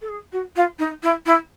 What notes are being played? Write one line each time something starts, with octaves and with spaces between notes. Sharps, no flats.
A4
G#4
F#4
F4
D#4
E4
E4